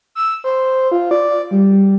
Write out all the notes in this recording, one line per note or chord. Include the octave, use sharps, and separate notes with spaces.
E6
C5
F4
D5
G3